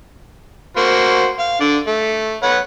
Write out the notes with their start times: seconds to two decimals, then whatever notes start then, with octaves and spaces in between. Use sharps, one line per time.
0.77 A#3 F#4 C5
1.39 F5
1.61 D3 D5
1.88 A3
2.43 B4 C#5 F#5